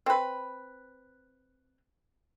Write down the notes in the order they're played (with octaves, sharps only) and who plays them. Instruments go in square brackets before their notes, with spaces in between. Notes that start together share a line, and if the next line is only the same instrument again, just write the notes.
[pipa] C4 B4